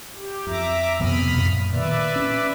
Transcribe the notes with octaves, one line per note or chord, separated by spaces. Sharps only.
G4
F2 E5 A#5 D6
F2 C3 B3 B5 D#6 F6
F#2 A#2
A#2 D#3 B4 D5 E5
C#4